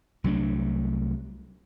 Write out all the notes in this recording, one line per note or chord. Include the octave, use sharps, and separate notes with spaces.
C2 F#3 A3 D4